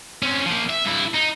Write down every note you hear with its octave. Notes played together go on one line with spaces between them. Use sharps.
C4 C#4
F3 A#3
E5
G2 E4
D#4